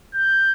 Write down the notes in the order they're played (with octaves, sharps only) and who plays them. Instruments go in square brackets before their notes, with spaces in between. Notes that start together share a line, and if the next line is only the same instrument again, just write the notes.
[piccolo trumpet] G6